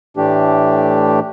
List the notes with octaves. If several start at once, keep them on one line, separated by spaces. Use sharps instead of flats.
A2 E3 A3 D4 G4